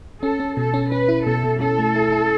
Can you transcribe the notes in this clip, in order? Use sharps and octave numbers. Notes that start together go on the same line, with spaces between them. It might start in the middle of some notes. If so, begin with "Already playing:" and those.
C#4 A4
C#4
B2 A4
C#4
C#4 B4
E4
B2 A4
B2
C#4 A4
A3
E4
E4